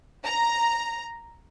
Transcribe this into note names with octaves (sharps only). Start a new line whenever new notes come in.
A#5